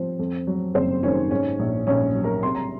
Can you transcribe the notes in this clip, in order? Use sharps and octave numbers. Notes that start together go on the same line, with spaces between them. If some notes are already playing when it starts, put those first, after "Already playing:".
Already playing: F3 C4 C5
F2
F#3
F#1 C4 C5
D#3 C#4 C#5
G#2 C#4 C#5
A#1
A#1 C#4 C#5
F#3
A#4 A#5
C3 C6
A#5